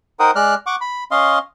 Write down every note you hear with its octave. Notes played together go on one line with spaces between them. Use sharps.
D#4 A#4 C5 F#5 G5 D#6
G#3 D5 F6 F#6
F#5 C#6 D6
B5
C#4 D#5 F5 C6